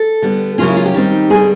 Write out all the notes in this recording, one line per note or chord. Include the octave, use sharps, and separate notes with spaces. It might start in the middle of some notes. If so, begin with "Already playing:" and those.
Already playing: A4
D3 G3 B3
C#3 F#3 A#3 C#4 F4
E4
F4
G4
D#3 G3 C4 D#4
G2 D3 G3 G#4